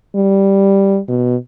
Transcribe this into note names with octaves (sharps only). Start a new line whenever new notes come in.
G3
B2